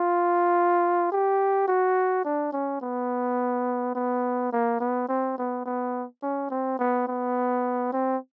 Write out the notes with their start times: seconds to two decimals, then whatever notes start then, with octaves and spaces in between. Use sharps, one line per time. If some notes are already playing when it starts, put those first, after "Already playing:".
Already playing: F4
1.12 G4
1.67 F#4
2.24 D4
2.53 C#4
2.81 B3
3.95 B3
4.52 A#3
4.80 B3
5.08 C4
5.38 B3
5.66 B3
6.22 C#4
6.50 C4
6.79 B3
7.07 B3
7.92 C4